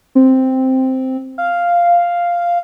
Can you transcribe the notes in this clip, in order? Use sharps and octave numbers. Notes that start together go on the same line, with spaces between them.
C4
F5